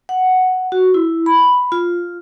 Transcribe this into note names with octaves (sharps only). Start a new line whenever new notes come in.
F#5
F#4
E4
B5
F4